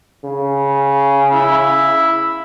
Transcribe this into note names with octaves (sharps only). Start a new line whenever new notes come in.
C#3
E4